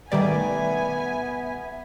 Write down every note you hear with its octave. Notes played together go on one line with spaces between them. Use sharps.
B2 D#3 G3 A3 B3 D5 E5 G#5